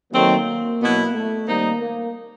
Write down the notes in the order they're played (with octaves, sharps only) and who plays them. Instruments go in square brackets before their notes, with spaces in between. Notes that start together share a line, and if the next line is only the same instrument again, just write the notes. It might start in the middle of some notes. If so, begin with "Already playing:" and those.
[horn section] D#3 F#3 A3 C4 [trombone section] A#3
[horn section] B2 F#3 B3 E4
[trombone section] A3
[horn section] D#3 G3 C4 D#4 [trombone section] A#3
[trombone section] A#3